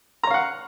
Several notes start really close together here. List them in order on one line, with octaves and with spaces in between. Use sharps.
A#5 C#5 F5 F#5